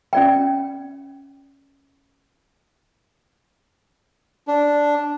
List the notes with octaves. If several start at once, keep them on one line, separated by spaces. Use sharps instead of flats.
C#4 D5 G5
D4